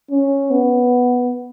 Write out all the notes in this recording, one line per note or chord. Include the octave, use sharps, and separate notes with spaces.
C#4
B3